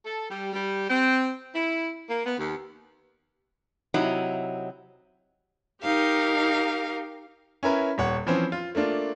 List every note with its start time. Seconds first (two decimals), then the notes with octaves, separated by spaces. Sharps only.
0.05 A4
0.30 G3
0.53 G3
0.89 C4
1.55 E4
2.09 A#3
2.26 B3
2.38 D#2
3.94 C3 F#3 D#4 E4
5.83 D#4 G4 A#4 F5
7.63 C#4 E4 A#4 B4
7.98 D#1 C#5 F#5
8.26 E3 F3 C4 C#4 B4 C5
8.52 F4
8.75 A3 A#3 D4 F4